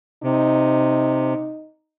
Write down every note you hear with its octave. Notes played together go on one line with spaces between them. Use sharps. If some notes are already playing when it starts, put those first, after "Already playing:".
C3 D#4